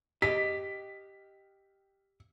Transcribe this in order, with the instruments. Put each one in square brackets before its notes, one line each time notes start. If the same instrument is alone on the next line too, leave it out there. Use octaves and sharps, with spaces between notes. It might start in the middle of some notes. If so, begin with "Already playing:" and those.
[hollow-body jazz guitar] G4 D#5 [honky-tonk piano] B6